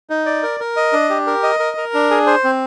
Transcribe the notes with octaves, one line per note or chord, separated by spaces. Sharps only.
D#4
D5
A#4
A#4
D#5
D4
G4
A#4
D#5
A#4
A#4
D4
G#4
C5
C4